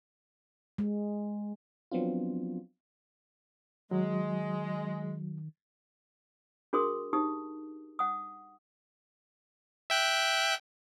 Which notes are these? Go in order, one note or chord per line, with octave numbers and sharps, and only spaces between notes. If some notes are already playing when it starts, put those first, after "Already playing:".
G#3
F3 F#3 B3 C4 D4 F4
D#3 F#3 G#3
D4 F#4 G#4 A#4 C6 D#6
D#4 G4 D#6
F#5 D#6
E5 G5 F#6